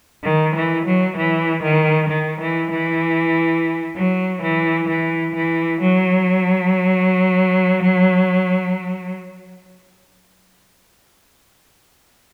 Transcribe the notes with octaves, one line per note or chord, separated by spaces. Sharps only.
D#3
E3
F#3
E3
D#3
D#3
E3
E3
F#3
E3
E3
E3
F#3